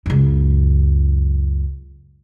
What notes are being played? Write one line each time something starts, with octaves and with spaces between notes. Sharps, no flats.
C#2 F#2